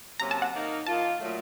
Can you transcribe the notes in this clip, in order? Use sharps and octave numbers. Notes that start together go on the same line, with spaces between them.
C3 F#3 A#3 C#4 A#5
A5
F#5
D#3 A#3 D#4
D#3 A#3 F4 A5
A#2 F#3 A3